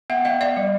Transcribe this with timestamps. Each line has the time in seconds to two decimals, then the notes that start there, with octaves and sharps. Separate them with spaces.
0.10 B3 E5 F#5
0.25 B3 D#5 F5
0.41 B3 D5 E5
0.57 G3